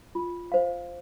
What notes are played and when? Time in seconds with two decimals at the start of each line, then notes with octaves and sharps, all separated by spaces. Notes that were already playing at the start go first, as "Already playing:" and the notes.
0.15 F4
0.52 C5 F5